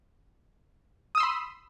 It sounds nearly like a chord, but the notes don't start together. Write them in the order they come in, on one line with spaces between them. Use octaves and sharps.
D#6 E6 C6 B5